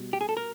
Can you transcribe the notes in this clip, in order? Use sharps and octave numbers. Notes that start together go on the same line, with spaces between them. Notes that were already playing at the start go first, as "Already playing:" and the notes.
Already playing: B2 G3
G4
G#4
A4
A#4